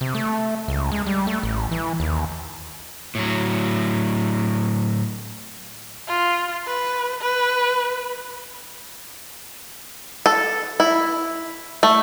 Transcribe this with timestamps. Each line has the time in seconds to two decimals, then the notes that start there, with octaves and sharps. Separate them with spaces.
0.01 C3
0.15 A3
0.68 C#2
0.92 G#3
1.06 G3
1.27 A3
1.43 A1
1.71 E3
2.00 D#2
3.15 A2 F#3
6.08 F4
6.66 B4
7.21 B4
10.26 A4
10.80 E4
11.83 A3